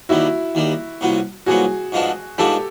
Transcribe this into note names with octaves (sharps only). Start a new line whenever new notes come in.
D#2 D#3 G3 E4 F#4
D#2 D#3 G3
C2 A#2 F#3 B3
C2 A#2 F#3 B3 F#4 G#4
G#2 F3 G#3 B3 D4
G#2 F3 G#3 B3 D4 G4 A4